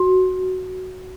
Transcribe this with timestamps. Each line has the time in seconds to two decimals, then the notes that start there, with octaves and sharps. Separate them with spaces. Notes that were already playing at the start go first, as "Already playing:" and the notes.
Already playing: F#4